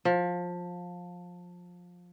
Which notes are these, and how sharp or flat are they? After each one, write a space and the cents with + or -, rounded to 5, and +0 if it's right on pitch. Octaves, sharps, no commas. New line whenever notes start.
F3 +20